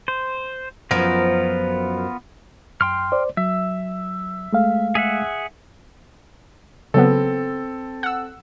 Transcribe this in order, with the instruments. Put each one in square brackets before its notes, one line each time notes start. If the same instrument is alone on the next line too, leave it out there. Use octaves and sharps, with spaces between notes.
[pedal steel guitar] C5
[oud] F#2 F3 [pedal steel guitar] B3 F4 A#4
[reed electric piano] F#2 [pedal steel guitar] G5 C6 F6
[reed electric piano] C5 D5
[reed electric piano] F#3 [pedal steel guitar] E5
[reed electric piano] G#3 A3 F5
[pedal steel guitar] G#4 E5 F#5
[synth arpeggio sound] C#3 F#3 B3 [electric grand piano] C4 A4
[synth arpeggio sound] F#5 E6